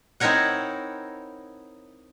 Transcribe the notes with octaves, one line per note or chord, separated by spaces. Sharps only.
C4 D#4 E4 A#4 C#5 F#5